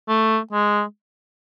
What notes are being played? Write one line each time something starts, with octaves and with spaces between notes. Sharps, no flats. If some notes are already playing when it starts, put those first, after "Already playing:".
A3
G#3